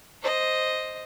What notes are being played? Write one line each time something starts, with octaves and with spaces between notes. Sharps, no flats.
C5 D#5